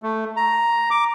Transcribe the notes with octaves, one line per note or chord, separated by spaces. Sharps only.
A3
A#5
D6